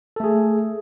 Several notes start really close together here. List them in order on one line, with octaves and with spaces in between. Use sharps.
A4 A3 G#4